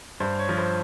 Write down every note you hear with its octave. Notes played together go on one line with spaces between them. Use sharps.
G2 C5
C#5
F3
C5